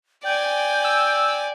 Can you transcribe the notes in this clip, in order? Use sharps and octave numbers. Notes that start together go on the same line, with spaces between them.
D5 G5 G#5
E6